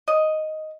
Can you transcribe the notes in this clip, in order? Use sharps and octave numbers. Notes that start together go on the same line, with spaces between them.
D#5